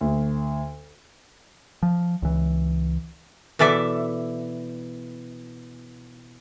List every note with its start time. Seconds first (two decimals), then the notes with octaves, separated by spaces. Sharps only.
0.01 D2
1.83 F3
2.22 C#2 E3
3.59 B2 E3 A4 D5 E5